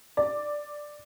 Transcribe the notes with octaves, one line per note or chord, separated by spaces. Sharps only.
D5